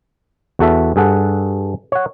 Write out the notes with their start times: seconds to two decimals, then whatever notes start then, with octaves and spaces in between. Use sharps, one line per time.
0.59 E2 F#4 A4 E5
0.96 G2 G#4 A4 F#5
1.92 C#5 F#5